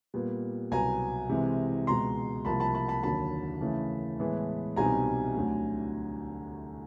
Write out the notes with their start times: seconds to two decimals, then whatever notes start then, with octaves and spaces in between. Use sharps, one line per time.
0.14 A#2 G3 B3
0.71 C2 B2 F#3 B3 G#5 A#5
1.29 C3 E3 G#3 C4
1.87 C#2 B2 G#3 A#5 C6
2.45 C2 C3 F3 A#3 A5 B5
2.60 A5 B5
2.74 A5 B5
2.88 A5 B5
3.03 D#2 D3 F#3 A5 B5
3.61 C#3 E3 A3
4.19 A2 E3 G#3 B3
4.76 C2 B2 G3 C4 D#4 G#5 A#5
5.35 D2 D3 F#3 A3